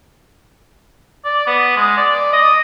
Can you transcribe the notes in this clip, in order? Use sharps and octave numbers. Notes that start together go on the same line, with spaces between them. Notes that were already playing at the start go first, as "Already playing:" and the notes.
D5
B3
G#3
D5
D#5